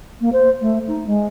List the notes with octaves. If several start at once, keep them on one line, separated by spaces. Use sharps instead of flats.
A#3
C5
A3
D#4
G#3